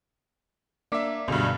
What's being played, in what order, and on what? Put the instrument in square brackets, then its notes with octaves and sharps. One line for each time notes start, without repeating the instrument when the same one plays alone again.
[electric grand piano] A#3 E5 [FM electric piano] D4 D6 B6
[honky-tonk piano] C#2 G2 [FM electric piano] B2 D3